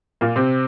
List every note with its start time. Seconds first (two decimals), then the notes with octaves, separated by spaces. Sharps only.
0.21 A#2 A#3
0.36 C3 C4